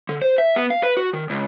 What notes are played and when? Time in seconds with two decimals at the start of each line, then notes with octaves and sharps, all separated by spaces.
0.09 D3
0.22 C5
0.38 E5
0.56 B3
0.70 F5
0.83 B4
0.97 F#4
1.13 D#3
1.30 C#2